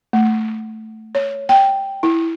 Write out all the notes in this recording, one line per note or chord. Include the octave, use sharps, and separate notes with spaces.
A3
C#5
G5
E4